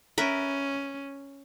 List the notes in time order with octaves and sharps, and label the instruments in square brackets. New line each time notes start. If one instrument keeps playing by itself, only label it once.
[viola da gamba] C#4 [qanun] A#4 B4 E5